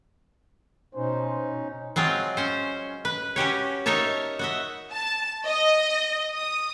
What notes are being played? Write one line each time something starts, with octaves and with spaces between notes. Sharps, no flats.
B2 C#4 D#4 C5
F#3 G#3 C4 F4
C#4 C5
B4
C#4 F#4 G4 C#5
D#4 A#4 C#5 E5 A5
F#4 D#5 E5
A5
D#5
D#6